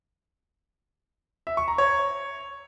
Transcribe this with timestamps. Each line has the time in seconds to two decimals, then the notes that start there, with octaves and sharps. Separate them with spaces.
1.47 E5
1.57 C#6
1.68 A#5
1.78 C#5